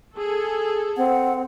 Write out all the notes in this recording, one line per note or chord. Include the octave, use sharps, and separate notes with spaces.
G#4 A4
C4 F#5